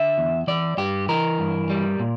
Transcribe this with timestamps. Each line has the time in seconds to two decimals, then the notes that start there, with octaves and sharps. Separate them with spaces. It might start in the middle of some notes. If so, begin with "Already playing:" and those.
Already playing: D3 E5
0.18 E2
0.47 E3 D5
0.77 G2 G4
1.09 E3 A#4
1.39 G2
1.70 G3
1.99 A#2